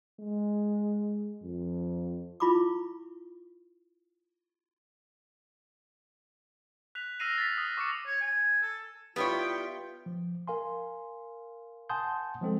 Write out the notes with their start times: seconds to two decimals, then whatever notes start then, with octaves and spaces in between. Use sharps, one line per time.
0.20 G#3
1.43 F2
2.40 E4 F4 B5 C#6 D6
6.95 F#6 B6 F7
7.20 E6 F6 A#6 C7 D#7 F7
7.38 A6 B6
7.58 D#6
7.77 C#6 D6 A#6 C#7
8.06 C#5
8.21 G#5
8.62 A4
9.16 G3 B3 E4 F4 C#5 G5
10.06 F3
10.48 A#4 F5 G#5 C6
11.89 F#5 G#5 A5 C6 D#6 G6
12.41 F3 G#3 C4 A4